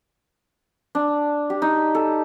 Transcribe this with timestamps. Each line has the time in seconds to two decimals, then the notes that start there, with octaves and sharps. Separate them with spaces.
0.95 D4
1.50 G4
1.62 D#4
1.95 A4